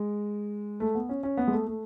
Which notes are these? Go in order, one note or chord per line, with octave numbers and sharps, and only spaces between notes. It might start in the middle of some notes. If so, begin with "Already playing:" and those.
Already playing: G#3
A3
B3
C#4
C#4
B3
G#3
A3
A3